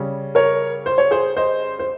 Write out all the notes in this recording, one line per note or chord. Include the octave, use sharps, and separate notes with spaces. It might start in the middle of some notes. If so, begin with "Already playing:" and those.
Already playing: C#3 G3 C#4
A#4 C#5
C5
C#5
G#4 C5
C5 D#5
C5